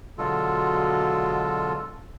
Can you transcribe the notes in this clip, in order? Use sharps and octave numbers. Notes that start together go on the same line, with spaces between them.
B2 D3 F#3 G#3 F4 A4